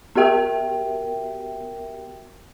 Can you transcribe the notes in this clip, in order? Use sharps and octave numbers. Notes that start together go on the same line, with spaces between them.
B3 F#4 G4 A#4 E5 G5